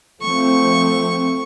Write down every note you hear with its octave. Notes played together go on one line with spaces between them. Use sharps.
F3 A3 C4 C#6